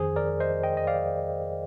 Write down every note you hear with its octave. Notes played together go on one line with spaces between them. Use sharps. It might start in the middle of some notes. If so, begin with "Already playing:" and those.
Already playing: F2 D#3 G#4 C5
A#4 D5
C5 D#5
D#5 G5
D#5
D5 F5